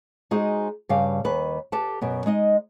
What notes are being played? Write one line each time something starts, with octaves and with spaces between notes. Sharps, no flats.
G#3 D#4 F#4 G#4 C5
G2 C#3 G3 F5
D#2 D#3 B4
G4 A4 B4 A5
F#2 B2 B3
G#3 D#4 D#5